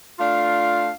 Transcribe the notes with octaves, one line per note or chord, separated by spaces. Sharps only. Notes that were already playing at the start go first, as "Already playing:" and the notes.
A3 D4 F4 F5